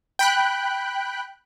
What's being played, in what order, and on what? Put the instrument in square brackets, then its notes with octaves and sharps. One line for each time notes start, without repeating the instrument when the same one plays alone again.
[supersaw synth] G5 B5 F#6